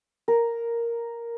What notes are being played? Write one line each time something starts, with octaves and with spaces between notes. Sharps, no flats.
A#4